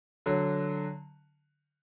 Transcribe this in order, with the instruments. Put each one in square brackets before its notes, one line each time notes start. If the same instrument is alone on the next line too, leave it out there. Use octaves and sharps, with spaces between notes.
[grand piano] D3 F#3